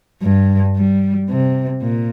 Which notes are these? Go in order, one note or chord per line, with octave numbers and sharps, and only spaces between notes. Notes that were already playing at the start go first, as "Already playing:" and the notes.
G2
G3
C3
A#2